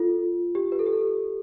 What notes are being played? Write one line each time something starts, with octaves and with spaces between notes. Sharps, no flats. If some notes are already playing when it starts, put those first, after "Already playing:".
Already playing: F4 A4
G4
B4
A4
G4
A4